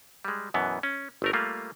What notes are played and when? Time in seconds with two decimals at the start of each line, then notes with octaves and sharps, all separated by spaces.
0.25 G3 G#3
0.54 F#2 B2 E3 B3
0.83 C#4
1.22 G1 A3 A#4
1.33 G3 A3 A#3 F4